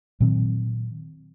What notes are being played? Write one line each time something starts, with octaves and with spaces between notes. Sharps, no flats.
A#2 D#3 F#3 C4